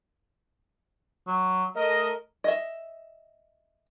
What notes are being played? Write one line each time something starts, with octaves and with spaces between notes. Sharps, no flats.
F#3
A3 A#4 D#5
D#5 E5